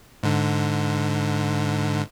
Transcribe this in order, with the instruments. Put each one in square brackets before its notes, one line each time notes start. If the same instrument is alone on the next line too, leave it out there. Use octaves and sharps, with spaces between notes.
[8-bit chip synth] G#2 D3